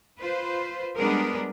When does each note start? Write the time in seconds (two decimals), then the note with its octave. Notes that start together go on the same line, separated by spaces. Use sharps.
0.21 F4 B4 C5
0.96 G3 G#3 B3 D4 G#4 A#4